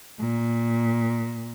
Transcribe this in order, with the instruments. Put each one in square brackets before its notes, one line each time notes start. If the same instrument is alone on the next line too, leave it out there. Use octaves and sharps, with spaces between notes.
[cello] A#2